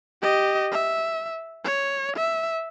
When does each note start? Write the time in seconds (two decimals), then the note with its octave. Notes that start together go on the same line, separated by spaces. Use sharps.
0.22 G4 D#5
0.72 E5
1.65 C#5
2.17 E5